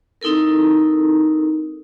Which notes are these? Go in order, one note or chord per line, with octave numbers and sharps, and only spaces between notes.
C4 D#4 E4 A4 A#4